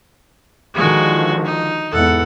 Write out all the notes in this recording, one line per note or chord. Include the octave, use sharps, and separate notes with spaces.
D3 D#3 F3 G#3 F#4
D#4
E2 G#2 A4 F#5